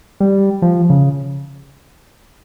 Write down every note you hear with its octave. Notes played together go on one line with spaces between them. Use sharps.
G3
F3
C#3